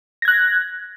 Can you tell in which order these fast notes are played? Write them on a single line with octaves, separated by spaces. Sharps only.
A#6 G#6 F#6